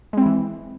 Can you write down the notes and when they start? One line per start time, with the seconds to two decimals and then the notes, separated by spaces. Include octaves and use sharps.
0.13 G#3
0.17 C4
0.22 E4
0.26 E3